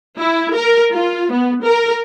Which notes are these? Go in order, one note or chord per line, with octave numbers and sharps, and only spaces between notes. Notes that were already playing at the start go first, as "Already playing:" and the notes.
E4
A#4
F4
B3
A#4